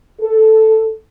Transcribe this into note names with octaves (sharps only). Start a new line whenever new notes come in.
A4